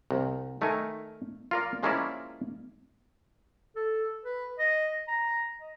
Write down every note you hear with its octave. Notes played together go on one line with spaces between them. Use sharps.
C2
D#3 A3 D#4 A#4 G#5
F4 A#4 D5
F3 G#3 A#3 C#4 E4 D5
A4
B4
D#5
A#5
D#5